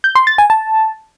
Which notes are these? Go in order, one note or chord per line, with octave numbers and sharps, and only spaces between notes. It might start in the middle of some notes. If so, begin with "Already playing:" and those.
G6
C6
A6
G#5
A5